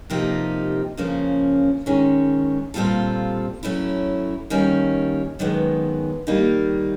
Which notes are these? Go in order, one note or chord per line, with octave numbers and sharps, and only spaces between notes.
C3 F3 A#3 D#4 G4
C#3 F3 A#3 C#4
D#3 G#3 C#4
A#2 G3 C4 F4 A4
F#3 A3 C#4 E4
D#3 G3 A#3 C#4
F#2 D#3 G#3 B3
D#3 G3 A#3 D#4